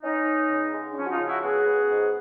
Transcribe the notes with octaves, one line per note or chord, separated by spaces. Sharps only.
B3 C#4 D#4
B3
C#3
G#3
D4
F3 C#4
F#4
D#4 F4
C#3
E4 F#4
B3 F#4 G#4
B3
G#2